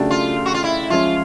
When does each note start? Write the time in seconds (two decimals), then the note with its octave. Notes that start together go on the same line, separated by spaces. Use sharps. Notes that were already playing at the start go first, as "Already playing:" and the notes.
Already playing: C#3 F#3 A3 D4 G4
0.11 F4
0.46 F#4
0.54 F4
0.64 E4
0.90 F3 G#3 C#4 F4